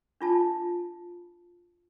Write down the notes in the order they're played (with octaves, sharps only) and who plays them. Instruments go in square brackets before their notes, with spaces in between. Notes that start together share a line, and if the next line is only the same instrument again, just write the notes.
[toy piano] D4 F4 A5